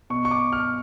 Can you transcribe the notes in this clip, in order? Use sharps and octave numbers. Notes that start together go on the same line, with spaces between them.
B2 C#6
C#6
D6
F6